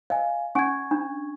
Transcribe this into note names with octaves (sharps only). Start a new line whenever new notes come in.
D#5 F5 G#5
C#4 G#5 C#6 G#6
D4